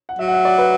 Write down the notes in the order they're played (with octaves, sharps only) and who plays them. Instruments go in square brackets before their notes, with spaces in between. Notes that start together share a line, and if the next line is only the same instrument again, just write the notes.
[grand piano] F#5
[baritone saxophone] F#3 [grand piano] E5
[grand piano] F#5
E5
D5
B4